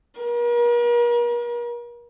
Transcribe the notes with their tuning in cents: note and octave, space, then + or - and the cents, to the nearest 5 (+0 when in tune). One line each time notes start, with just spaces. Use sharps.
A#4 +40